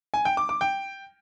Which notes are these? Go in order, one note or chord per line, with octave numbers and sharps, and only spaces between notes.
G#5
G5
D6
D6
G5